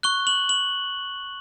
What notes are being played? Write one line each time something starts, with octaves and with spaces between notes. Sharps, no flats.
C#6 F#6 G7
F#7
F#7